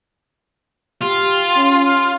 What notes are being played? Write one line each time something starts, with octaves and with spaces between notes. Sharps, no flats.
F4 G4
C#4